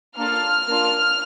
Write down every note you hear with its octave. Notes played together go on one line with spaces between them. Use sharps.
A#3 D4 F4 A4 F6
A#3 D4 F4